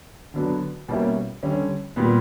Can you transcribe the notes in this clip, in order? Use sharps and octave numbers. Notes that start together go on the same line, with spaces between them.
D3 F#3 B3 D4
B2 G3 A#3 C#4 E4
D3 G3 C#4
A#2 G3 B3